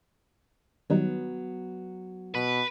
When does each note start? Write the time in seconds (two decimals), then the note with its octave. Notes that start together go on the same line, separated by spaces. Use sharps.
0.90 D#3 F#3 G3 B3 D#4
2.35 B2 B4